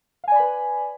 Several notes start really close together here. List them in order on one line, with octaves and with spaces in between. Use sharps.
F5 G#5 D5 B5 B4